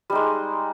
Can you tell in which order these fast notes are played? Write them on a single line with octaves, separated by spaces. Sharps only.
G3 D#4 G#3